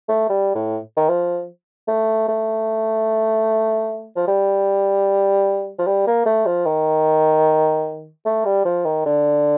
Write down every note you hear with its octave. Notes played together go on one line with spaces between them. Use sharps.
A3
G3
A2
D#3
F3
A3
A3
F3
G3
F3
G3
A#3
A3
F3
D#3
A3
G3
F3
D#3
D3